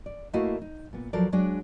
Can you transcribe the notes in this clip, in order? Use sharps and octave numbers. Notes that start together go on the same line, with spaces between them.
D5
A3 A#3 E4 F#4 D#5 F5
D#4
A#2 B3
F3 F#3 A4 A#4 C5 D5
F#3 G#3 D4 D5